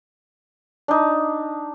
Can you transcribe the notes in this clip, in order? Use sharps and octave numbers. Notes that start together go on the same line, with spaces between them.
D4 D#4